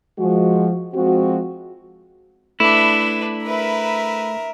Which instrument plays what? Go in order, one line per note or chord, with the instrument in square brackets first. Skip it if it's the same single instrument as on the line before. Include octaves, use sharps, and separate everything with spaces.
[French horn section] F3 G#3 F#4
F3 G#3 C4 F#4
[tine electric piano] A3 [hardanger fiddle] D4 B4 [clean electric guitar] E4
[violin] A#4 E5 [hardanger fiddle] B4